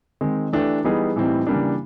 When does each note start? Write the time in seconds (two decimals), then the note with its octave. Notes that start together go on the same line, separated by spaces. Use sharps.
0.21 D#3 G#3 C4
0.53 E3 A3 D4 G4 B4
0.84 E3 G3 B3 D#4 G#4
1.16 A2 E3 G3 C4 D#4
1.47 C#3 E3 G3 A#3 D4